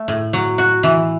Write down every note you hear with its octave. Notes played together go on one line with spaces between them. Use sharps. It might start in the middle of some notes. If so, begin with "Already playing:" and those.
Already playing: A3
A2
F#3
F#4
E3